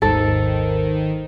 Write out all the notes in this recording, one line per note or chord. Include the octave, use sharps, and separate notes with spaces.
G#1 D#2 G#2 D#3 A4 C5